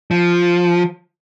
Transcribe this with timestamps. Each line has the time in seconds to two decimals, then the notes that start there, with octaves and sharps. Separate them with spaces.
0.11 F3